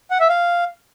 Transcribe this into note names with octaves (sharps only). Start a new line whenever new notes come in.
F#5
E5
F5